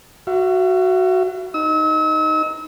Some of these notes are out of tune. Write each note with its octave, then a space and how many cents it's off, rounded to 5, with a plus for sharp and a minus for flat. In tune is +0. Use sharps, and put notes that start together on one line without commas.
F#4 +0 E5 +45
D#4 +0 E6 -40